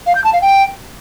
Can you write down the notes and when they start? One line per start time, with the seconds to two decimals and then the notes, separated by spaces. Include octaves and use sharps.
0.06 F5
0.15 G6
0.24 A5
0.33 F5
0.42 G5